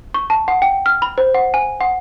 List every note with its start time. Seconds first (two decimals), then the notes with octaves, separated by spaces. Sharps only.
0.14 C#6
0.30 A5
0.48 F#5
0.62 G5
0.86 F6
1.02 B5
1.18 C5
1.35 F#5
1.54 G#5
1.81 F#5